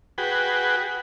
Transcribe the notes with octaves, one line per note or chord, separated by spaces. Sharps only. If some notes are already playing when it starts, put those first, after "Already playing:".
F#4 G#4 B4 G5